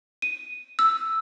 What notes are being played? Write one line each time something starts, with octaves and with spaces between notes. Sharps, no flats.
D#7
E6